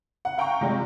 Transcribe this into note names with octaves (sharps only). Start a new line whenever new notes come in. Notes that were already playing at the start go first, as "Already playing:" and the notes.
F#5
F5 G5 A#5 C#6
C3 F3 G3 G#3 F4